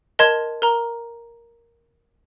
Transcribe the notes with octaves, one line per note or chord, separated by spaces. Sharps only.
A#4 D#5 A5 C6 G#6 E7
A#4 A#5